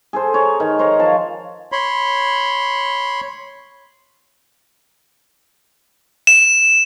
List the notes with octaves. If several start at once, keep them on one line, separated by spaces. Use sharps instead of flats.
G#4 A4 C5
C#5 A#5
D#3
C5 C#5 A#5
F3 A5
C#5 B5 C6
E7